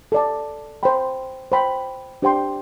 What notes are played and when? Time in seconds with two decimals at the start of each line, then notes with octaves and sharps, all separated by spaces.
0.12 A4 D5 A5
0.83 C5 G5 B5
1.52 C5 G5 B5
2.22 D4 G4 C5 G5 C6